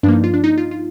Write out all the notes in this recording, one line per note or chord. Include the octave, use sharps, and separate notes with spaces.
G2 F3 A#3 D4
D#4
F4
D4
D#4
F4
F4